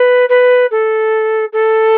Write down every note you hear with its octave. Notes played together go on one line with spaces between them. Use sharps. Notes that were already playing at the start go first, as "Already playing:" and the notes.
Already playing: B4
B4
A4
A4